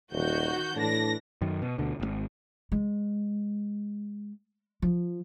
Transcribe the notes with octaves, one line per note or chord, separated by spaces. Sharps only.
D#1 D#3 F#4 G6
A2 E3 D4 A#6
F#2 D#3
B2
D2 B2 D3
D#1 G#1
G#3
F3